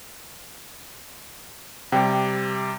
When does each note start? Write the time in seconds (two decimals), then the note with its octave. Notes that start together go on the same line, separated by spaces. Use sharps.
1.92 C3 G3 G4 G5